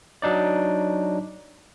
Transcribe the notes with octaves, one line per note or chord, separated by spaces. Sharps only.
F#3 D4 D#4 D5